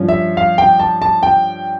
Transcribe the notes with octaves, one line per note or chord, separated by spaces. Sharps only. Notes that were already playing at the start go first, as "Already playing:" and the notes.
Already playing: G2 F3 C#4
E5
F5
G5
A5
A5
G5